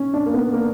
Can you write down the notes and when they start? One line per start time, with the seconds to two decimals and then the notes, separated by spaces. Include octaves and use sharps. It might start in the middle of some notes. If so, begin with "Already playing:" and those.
Already playing: C#4
0.14 D4
0.26 A#3
0.34 B3
0.53 A#3